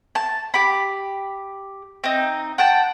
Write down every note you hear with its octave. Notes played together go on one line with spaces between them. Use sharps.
A5
G4 B5
C4 D#4
F#5 G5 A5